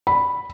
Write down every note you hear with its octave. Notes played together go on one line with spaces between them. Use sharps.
B5